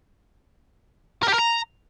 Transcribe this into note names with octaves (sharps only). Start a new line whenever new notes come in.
A#4
G4
A#4
A#5